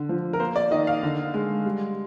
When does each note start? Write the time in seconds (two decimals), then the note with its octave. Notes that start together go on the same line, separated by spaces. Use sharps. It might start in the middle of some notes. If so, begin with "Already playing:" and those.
Already playing: D3
0.09 F3
0.33 A#4
0.40 A#3 C5
0.56 D5
0.71 D#3 D#5
0.87 F5
1.03 D3
1.34 G#3
1.65 G3